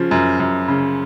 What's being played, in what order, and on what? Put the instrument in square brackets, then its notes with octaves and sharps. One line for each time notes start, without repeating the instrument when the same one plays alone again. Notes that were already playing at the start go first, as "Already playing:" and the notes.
Already playing: [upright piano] C#3 F3
F#2
F#2
C#3